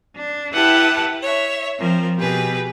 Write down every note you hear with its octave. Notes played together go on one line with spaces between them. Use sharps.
D4
E4 G4 B4 F#5 G5 A5
C#5 E5
F3 C4 A#4
B2 G4 G#4 B4